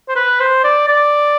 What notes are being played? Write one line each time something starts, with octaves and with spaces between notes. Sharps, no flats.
C5
B4
C5
D5
D5